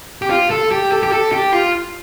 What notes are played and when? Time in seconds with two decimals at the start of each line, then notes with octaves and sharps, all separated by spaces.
0.22 G4
0.30 F4
0.50 A4
0.71 G4
0.92 A4
1.03 G4
1.12 A4
1.32 G4
1.53 F4